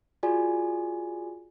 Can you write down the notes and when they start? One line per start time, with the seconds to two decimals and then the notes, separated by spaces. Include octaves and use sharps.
0.23 F4 F#4 G#4 D5 G#5